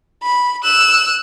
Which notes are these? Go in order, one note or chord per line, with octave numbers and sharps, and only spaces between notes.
B5
E6 F#6